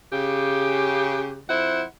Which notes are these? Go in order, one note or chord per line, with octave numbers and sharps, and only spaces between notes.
C#3 G4
F2 E4 C5 F#5